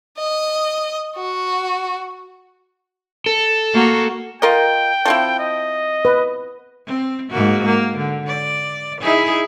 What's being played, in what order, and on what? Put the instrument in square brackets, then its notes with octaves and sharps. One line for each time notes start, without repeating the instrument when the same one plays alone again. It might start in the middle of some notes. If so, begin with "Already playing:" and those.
[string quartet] D#5
F#4
[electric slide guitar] A4
[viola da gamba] A#3 F#4
[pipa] F4 A#4 D#5 [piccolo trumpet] G5
[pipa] F3 C4 E4
[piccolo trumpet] D#5
[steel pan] B4
[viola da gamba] C4
G#2 A#3 F#4
A#3
D3
D5
D#4 E4 G#4